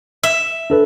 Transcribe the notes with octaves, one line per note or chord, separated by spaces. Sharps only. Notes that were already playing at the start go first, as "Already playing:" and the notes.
E5
D4 A4 B4